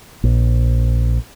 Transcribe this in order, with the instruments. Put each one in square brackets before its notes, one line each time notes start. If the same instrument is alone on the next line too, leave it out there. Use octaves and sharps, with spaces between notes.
[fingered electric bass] A#1